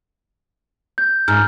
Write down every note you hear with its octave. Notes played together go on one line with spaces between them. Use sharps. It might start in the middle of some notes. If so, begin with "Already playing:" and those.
G6
G#2 F6